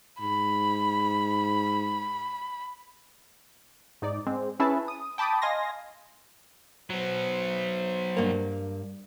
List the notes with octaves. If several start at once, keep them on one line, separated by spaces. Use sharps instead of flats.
G#2 B5
G#2 D#4 D5
G#3 C4
C#4 E4 G#4 B4 E5 A5
D#6
G5 A5 B5 D6 D#6
D#5 F5 G#5 C6 A#6
F#3 B3 C5
G2 A#3